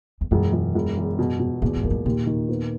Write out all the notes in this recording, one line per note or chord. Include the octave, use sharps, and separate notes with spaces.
E2
E1 F#2
E1
E1
E2
B2
B2
E2 A#2
G#2
F#2 A#3
G#2
D#2 A#2
D#3
B3